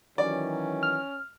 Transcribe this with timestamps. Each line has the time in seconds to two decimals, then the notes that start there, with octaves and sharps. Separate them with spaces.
0.18 D#3 E3 F#3 C#4 D5
0.83 F6